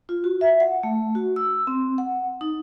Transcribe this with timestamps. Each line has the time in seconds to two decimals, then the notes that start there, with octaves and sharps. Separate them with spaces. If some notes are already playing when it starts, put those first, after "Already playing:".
0.09 F4
0.24 F#4
0.41 E5
0.60 F#5
0.83 A3
1.15 F#4
1.36 E6
1.67 C4
1.98 F#5
2.41 D#4